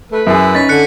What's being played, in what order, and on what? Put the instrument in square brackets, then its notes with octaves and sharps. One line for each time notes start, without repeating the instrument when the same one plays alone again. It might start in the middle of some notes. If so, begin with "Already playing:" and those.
[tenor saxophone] A3 [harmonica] B4
[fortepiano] F#2 G#4 [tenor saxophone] E4
[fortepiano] C#4 D#4 [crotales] A6 B6
[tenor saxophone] D3 [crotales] F#6 C#7